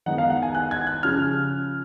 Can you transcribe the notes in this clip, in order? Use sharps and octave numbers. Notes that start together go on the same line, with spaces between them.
D#3 G#3 B3 D#4 F#5
F5
F#5
G#5
F#6
G#6
F#6
C#3 F3 F6